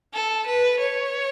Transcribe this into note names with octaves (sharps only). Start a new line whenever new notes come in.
A4
B4
C#5